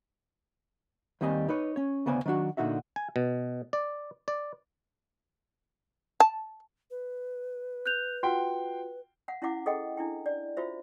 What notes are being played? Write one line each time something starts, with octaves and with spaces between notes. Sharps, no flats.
D#2 D#3 G3 C4 D#5 G#5
D#4 B4 C#5
C#4 C#5
D2 C#3 B3 C5 D5 G#5
D#3 F#3 D4 F#4
A#2 D3 D#4 F#4 E5
G#5
B2
D5
D5
A5
B4
F#6 G6 F7
F4 F#4 F#5 G5 C6
F5 F#5
C#4 E4 F5 F#5 D6
G#4 A4 D#5 F#5 G5
D4 E4 G5
D5
F4 F#4 C5 E5